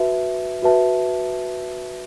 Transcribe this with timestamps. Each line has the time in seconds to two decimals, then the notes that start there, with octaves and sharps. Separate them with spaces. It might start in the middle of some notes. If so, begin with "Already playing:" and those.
Already playing: F#4 B4 E5 A5
0.62 F#4 B4 E5 A5